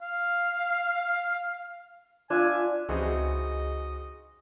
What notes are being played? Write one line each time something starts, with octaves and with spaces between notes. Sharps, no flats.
F5
D4 F4 E5 G#5
C#2 C#3 E3 C4 D#4 F#4 G#4 D#5